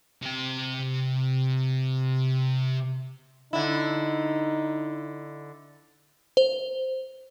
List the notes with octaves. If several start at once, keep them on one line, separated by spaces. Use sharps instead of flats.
C3 G5
D3 D#4 E4
C5